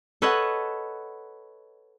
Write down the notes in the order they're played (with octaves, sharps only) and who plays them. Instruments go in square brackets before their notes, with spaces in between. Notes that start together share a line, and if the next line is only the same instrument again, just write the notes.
[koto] A4 B4 C#5 D#5 F#5 A5